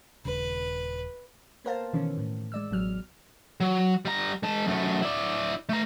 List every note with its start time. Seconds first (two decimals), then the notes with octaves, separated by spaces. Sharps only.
0.25 D#1 C#3 B4
1.65 A#3 B3 A#4 C5 F5 A5
1.93 B2 D#3 E3 C#4
2.18 A2
2.52 G#3 D5 E6
2.71 A1 B2 F#3 F6
3.60 F#3
4.05 G3 A#5
4.43 G#3 A5
4.67 F#2 A3
5.02 E4 D5
5.69 A3 A#5